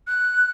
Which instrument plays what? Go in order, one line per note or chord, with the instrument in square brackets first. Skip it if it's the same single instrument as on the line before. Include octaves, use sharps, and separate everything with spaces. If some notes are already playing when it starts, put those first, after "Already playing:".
[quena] F#6